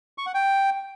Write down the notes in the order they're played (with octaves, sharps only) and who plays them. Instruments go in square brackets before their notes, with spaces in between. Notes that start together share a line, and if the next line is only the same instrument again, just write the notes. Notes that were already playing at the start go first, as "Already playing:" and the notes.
[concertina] C#6
F#5
G5